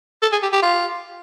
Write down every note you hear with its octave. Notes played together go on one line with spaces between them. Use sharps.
A4
G#4
G4
G4
F4